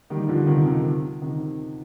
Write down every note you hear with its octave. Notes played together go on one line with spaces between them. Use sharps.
D#3 G3
D3 F3
C3 D#3
C3 D#3
C3 D#3